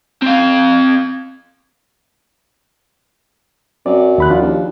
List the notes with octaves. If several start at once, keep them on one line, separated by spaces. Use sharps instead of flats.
C4 F5
F#2 C4 D5
D#2 B5 F#6
F3 D4 F4
D#2